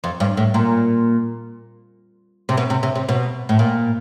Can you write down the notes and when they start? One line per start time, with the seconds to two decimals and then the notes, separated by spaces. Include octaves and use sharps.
0.04 F2
0.20 G2
0.37 A2
0.54 A#2
2.49 C3
2.57 B2
2.70 C3
2.83 C3
2.95 C3
3.09 B2
3.49 A2
3.59 A#2